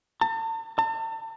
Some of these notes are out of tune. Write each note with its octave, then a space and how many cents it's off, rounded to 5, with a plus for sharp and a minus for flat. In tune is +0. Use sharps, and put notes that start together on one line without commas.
A5 +40
A5 +40